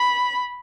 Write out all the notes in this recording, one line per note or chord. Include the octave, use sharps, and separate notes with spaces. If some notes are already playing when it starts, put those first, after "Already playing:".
Already playing: B5